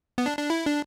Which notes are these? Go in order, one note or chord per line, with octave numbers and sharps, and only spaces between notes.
B3
D4
D4
E4
D4